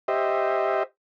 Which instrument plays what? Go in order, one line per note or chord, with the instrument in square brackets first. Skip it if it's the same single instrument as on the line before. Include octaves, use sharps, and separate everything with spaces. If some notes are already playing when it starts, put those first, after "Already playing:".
[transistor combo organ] G4 C5 D#5 E5